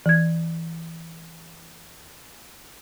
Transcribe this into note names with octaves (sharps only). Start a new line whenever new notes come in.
E3 G#6